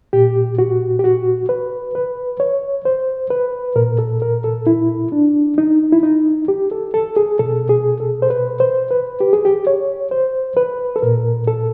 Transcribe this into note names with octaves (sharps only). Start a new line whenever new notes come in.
A#2 G4
F#4
G4
F#4
B4
B4
C#5
C5
B4
A#2 A#4
A4
A#4
A4
E4
D4
D#4
E4
D#4
G4
A4
A4
G#4
B2 A4
G#4
A4
C5
B4
C5
B4
G4
G#4
G4
C#5
C5
B4
A4
A#2 A#4
A4